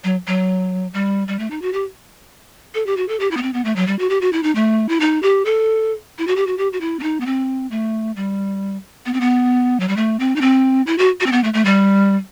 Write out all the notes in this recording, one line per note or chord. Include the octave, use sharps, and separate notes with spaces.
F#3
F#3
G3
G3
A3
D#4
F#4
G4
A4
G4
F#4
A4
G4
E4
B3
C4
B3
A3
F#3
G3
F#4
G4
F#4
E4
D#4
A3
E4
D#4
G4
A4
E4
F#4
G4
F#4
G4
F#4
E4
C4
D#4
B3
C4
A3
G3
B3
C4
B3
F#3
G3
A3
C4
D#4
C4
E4
F#4
F#4
C4
B3
A3
A3
G3